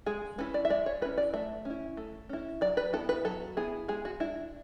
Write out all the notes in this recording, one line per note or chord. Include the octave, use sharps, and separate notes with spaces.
G#3 G#4
C#4 E4 B4
D5
E5
G#3 D5
C#5
C#4 E4 B4
D5
A3 E5
C#4 E4
A3
C#4 E4
F#3 D5
B4
B3 E4 A4
B4
F#3 A4
B3 E4 G#4
G#3 G#4
F#4
D4 E4